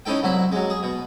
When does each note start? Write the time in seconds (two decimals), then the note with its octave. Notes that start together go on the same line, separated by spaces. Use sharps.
0.05 C#4 D#4 E4 A4 G5
0.23 C2 F#3 E4 B5
0.52 F#3 G#3
0.70 G#4
0.83 B2